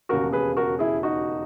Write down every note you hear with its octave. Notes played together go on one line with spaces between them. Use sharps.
E1 D#2 C#3 F#4 A#4
G#4 B4
F#4 A#4
E4 G#4
D#4 F#4